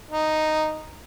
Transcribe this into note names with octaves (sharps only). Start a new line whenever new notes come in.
D#4